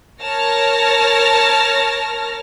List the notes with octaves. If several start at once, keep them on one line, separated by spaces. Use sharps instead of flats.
A#4 C#5 A5 F6 A#6